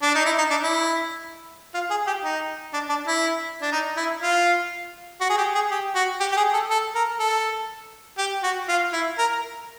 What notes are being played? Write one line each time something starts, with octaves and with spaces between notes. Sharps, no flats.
D4
D#4
E4
D#4
D4
E4
F4
G#4
G4
D#4
D4
D4
E4
D4
D#4
E4
F4
F#4
G#4
G4
G#4
G4
F#4
G4
G4
G#4
A4
A4
A#4
A4
G4
F#4
F4
E4
A#4